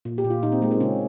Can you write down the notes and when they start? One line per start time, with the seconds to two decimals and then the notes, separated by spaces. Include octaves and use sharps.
0.05 A#2
0.18 G4
0.24 A#2
0.30 F4
0.43 A#2 D#4
0.52 C4
0.62 G#3 A#3
0.71 C4
0.80 C#3 C#4